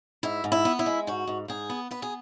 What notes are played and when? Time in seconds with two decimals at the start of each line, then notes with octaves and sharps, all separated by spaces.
0.23 G#2 E4
0.44 G#2
0.52 E4
0.65 B3
0.79 E4
0.86 G#3
1.07 G#2 F#4
1.27 G#2
1.48 G#2 G#4
1.70 B3
1.91 B3 B4
2.02 G#4